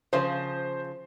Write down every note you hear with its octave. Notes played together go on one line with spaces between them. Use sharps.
C#3 F3 C5